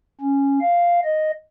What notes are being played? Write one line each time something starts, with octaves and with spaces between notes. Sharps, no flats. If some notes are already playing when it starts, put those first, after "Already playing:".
C#4
F5
D#5